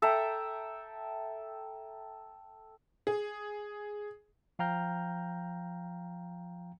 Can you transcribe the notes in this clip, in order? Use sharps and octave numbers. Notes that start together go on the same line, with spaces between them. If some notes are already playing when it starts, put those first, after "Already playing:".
A4 E5 G5 A#5
G#4
F3 F5 G5 A#5 F6 G6